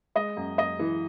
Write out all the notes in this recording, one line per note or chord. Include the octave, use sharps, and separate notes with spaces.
G#3 D#5
F#2
F#2 D#5
E3